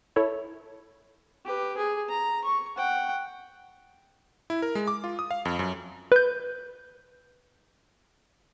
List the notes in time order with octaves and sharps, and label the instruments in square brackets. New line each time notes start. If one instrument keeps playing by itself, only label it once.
[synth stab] E4 A4 C#5
[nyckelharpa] G4 B4
G#4
A#5
C#6
F#5 G5
[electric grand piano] E4
A#4
G#3
D6
F4
D#6
F5
F2
F#2
[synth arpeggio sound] B4 G6